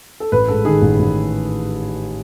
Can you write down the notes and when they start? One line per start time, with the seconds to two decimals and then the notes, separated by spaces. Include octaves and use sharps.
0.20 A4
0.32 A1 B4
0.48 G#2 A4
0.65 D#3 G#4
0.82 A1
0.99 A1